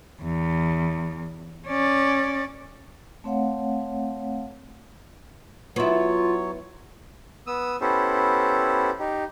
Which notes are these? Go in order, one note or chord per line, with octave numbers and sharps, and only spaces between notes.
E2
C#4 D5
A3 C4 C#5 F5 F#5
F#3 B3 E4 F4 C#5
B3 D#6 E6
B3 C#4 E4 G4 A4 C5
D#4 G4